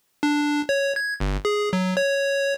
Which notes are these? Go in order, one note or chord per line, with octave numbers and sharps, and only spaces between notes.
D4
C#5
G#6
G1
G#4
F#3
C#5